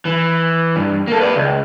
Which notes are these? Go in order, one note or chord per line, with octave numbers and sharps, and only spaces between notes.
E3
G2
A#3 A4
B4 D5
C#2